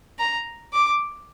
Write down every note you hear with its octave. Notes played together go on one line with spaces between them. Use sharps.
A#5
D6